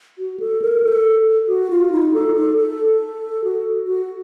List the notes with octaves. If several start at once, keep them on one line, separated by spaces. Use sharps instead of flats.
F#4
A4
A#4
A4
F#4
F4
D#4
A4
A4
A4
F#4
F#4